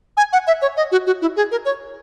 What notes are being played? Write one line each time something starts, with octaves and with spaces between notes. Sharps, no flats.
G#5
F#5
E5
C#5
D#5
F#4
F#4
E4
G#4
A#4
C#5